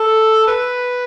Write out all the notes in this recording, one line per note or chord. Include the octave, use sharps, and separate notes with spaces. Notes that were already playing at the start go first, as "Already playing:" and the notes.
Already playing: A4
B4